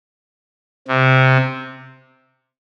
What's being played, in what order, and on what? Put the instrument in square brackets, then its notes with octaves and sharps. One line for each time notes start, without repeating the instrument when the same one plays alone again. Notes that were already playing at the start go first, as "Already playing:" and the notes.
[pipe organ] C3